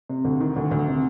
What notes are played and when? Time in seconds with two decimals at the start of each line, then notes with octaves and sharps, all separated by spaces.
0.09 C3
0.25 D2
0.40 D#3
0.56 D2
0.71 D2
0.88 C3